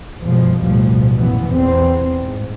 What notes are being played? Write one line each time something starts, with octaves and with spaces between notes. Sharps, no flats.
G1 F#2 B2 F3 G#3
A1 D2 B2 F3 G3
A#1 F#2 A#2 E3 B3
E2 C4
G#2